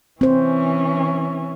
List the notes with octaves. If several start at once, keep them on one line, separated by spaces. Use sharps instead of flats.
E3 C4 C#4 C5